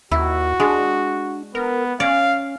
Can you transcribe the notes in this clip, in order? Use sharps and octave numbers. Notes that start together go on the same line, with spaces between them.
D#2 E4 F#4
G#3 D4
B3 A#4
C#4 D5 F5